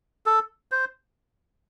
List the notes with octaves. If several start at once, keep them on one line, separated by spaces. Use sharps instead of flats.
A4
C5